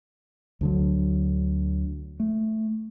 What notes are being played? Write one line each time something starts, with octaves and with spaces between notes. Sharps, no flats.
D2 D3 F#3
A3